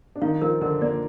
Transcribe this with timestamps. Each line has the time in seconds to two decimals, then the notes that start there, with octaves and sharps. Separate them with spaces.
0.16 D4
0.22 D#3 D#4 F5
0.42 F3 F4 A#4
0.61 D3 D4 A#4
0.81 A#3 D5